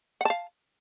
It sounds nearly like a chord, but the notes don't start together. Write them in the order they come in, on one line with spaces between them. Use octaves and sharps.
F#5 A5 F5